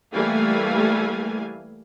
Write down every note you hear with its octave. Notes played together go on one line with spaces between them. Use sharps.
E3 G3 A3 A#3 F5 G#5